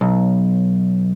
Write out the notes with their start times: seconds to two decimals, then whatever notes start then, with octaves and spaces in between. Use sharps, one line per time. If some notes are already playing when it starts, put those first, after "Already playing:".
0.01 B1